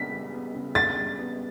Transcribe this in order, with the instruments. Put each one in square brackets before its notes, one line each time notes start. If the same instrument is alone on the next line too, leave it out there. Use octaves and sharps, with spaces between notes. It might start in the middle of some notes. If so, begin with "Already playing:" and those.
Already playing: [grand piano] C#3 B3 D4 [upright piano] B6
[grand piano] G3
B3
C#3
[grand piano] D4 [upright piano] A6
[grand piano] G3
B3